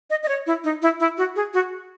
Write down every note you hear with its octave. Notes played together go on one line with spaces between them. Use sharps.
D#5
D#5
C#5
E4
D#4
E4
E4
F#4
G#4
F#4